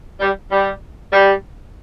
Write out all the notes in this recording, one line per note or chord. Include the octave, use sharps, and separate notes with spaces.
G3
G3
G3